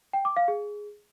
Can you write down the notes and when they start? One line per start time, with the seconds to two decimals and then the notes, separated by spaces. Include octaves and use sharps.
0.13 G5
0.25 D6
0.37 F5
0.48 G#4